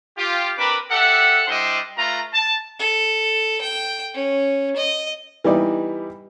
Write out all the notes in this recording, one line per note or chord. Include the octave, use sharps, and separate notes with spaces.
F4 G4
C4 D4 A#4 B4 B5 D6
G4 A4 E5 F#5
G3 D4 E4 C5 D#5 C6
A3 F4 B4 A#5
A5
A4
G5
C#4
D#5
E3 G3 B3 D#4 E4 D5